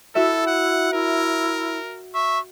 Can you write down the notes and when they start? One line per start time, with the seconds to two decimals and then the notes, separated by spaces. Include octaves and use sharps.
0.15 E4 F#4 A4 E5
0.47 F#5
0.93 E4 A#4
2.14 E5 C#6